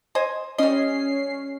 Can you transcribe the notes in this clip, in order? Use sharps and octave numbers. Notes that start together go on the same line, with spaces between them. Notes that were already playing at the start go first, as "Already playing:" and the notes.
C5 D#5 G#5
G3 C#4 D#5 C7